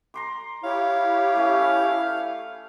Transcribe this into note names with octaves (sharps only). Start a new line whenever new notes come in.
A#5 C6 D6
E4 G4 C#5 F5
A3 C#4